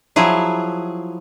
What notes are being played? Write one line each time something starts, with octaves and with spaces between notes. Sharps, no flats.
F3 F#3 E4 G#4